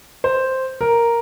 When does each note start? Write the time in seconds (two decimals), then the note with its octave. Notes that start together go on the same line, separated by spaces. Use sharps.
0.24 C5
0.81 A#4